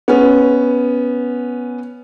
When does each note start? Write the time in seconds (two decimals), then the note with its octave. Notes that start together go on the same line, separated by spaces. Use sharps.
0.08 B3 C#4